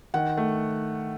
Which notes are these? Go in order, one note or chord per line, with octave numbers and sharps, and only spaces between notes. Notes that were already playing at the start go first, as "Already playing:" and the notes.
D#3 F#5
A3